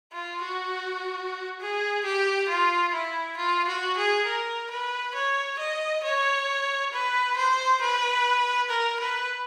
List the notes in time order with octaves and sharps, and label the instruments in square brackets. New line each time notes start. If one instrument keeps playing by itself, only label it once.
[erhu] F4
F#4
G#4
G4
F4
E4
F4
F#4
G#4
A#4
B4
C#5
D#5
C#5
B4
C5
B4
A#4
B4